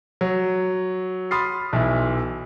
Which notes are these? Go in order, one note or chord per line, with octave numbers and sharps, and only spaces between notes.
F#3
B5 C6 D#6 F6 A6 C7
B1 E3 E5